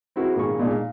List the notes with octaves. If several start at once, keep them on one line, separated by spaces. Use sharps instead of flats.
C4 E4 F#4 G#4 A#4
G#1 A#2 A#3 G#4 B5 C#6
A#2 G#3 D4 D#4
F5